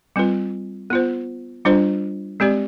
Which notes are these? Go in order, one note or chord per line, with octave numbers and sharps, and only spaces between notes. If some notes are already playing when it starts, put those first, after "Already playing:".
G3 C4 F4 B4
B3 F4 C5
G3 D4 F4 C5
G#3 C4 G4 D5